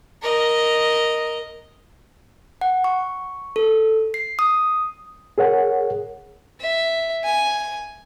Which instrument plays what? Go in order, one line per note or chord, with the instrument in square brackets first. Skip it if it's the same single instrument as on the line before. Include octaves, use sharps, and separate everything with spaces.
[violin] A#4 D#5
[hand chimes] F#5
C#6
A4
C7
D#6
[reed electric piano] G#4 A#4 C#5 F#5
[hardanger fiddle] E5
G#5